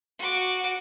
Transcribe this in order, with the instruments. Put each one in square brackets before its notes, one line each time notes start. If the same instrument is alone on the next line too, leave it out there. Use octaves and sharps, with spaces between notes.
[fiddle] F#4 D6